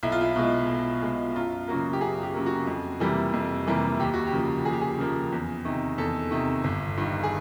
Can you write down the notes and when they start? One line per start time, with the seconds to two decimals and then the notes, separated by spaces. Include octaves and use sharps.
0.03 B1 E4
0.12 F4
0.21 E4
0.36 B2 G#3
0.69 B1
1.02 B2 G#3
1.35 F#2 F4
1.68 C#3 F#3 A#3 F#4
1.93 G4
2.01 F#2 G#4
2.23 G4
2.34 C#3 F#3 A#3
2.46 F#4
2.67 F2
3.00 C3 E3 G3 A#3
3.33 F2
3.67 C3 E3 G3 A#3
4.00 D#2 G4
4.14 F#4
4.27 G4
4.33 C#3 F3 A#3
4.65 D#2 G#4
4.73 G4
4.81 G#4
4.99 C#3 F3 A#3
5.33 E2
5.65 C3 D#3
5.98 E2 A4
6.31 C3 D#3
6.64 G1
6.97 G2 D#3
7.23 G#4